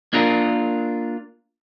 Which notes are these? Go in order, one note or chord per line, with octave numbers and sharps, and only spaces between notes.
A#3 D4 F4 A#4